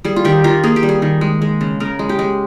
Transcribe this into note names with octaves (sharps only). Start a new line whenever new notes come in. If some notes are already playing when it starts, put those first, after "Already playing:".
G3 G#4
F4
D#3 G4
D#3 F4
A#3 G#4
G4
G3
G#4
D#3
G#3
G#3
C#3
C#3 A#4
G#3
G4
G#3